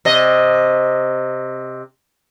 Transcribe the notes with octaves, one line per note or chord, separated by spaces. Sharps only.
C3 D#5